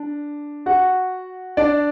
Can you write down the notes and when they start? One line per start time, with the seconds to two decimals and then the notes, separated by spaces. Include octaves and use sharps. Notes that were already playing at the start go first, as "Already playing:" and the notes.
Already playing: D4
0.66 F#4 F#5
1.57 D4 D5